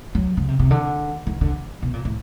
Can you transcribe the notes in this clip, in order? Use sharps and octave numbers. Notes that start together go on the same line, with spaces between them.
F#3
C#3
C3
C3
D3
D#3
D3
B2
A#2
A2